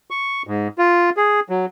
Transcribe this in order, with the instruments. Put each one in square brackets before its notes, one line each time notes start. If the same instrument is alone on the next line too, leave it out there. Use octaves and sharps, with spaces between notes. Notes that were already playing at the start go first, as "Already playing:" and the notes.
[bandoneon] C#6
G#2
F4
G#4
F#3